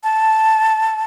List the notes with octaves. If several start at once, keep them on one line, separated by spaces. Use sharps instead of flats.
A5